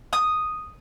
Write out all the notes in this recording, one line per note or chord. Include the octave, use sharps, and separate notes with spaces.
D#6